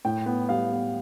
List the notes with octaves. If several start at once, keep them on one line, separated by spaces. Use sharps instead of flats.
A2 G5
B3
G3 F5
B3